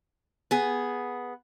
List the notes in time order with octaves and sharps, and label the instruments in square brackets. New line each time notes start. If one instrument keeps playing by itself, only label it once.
[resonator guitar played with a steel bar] B3 G#4